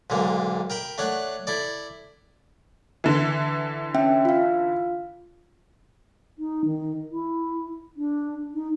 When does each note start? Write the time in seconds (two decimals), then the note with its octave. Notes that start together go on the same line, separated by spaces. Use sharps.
0.10 B1 G#2 D3 A#3
0.70 A#4 G5 B5
0.98 A3 D4 C#5 F#5
1.47 E4 A4 D5
3.04 D3 E3
3.95 C#4 E5 G5
4.25 F4 F5
6.39 D#4
6.65 D#3
7.11 E4
7.97 D4
8.54 D#4